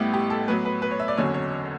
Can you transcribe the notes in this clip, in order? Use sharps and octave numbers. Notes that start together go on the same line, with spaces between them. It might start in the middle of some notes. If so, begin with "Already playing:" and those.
Already playing: A1 A2 G3 B3 E4 G4
G4
A4
A2 F#3 B3 B4
B4
B4
C#5
E5
D5
F#1 E2 D3 F#3 C#4 C#5
C#5